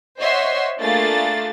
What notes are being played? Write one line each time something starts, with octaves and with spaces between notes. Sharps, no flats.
C5 C#5 D#5 E5 F#5 C6
A3 A#3 D4 F4 G#4 A6